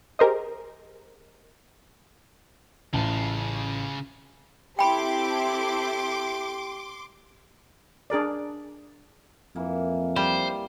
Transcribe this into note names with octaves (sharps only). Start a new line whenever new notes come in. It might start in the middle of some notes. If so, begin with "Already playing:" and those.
G4 G#4 A#4 C5 D#5
A1 C#3 F4 A5
C4 E4 G4 A4 G5 B5 C6 D6
D4 G#4 A#4 D5
F2 E3 A#3
G3 C5